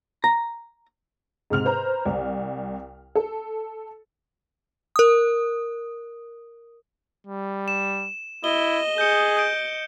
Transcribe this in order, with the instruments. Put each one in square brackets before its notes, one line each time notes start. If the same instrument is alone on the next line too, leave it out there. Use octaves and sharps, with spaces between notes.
[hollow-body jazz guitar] A#5
[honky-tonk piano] G#2 C3 F6 F7
B4 C5 A#5
C2
A4
[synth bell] A#4 D#6
[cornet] G3
[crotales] E7
[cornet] E4 [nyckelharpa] D#5 [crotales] G7
[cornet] G#4 [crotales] G6 C#7
[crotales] G6 D7